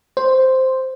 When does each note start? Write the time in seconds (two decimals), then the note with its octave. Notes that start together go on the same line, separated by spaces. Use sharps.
0.17 C5